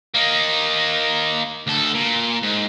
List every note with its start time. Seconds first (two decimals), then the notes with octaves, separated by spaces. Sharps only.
0.14 A#3 D#4
1.67 D2 A4
1.95 A#2
2.43 G#2